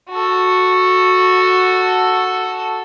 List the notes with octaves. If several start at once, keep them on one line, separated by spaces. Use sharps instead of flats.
F#4 A4